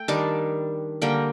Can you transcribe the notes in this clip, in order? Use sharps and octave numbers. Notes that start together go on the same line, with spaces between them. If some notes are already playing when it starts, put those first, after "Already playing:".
Already playing: A3 G5
D#3 G3 D4 A5
D3 G3 A#3 G5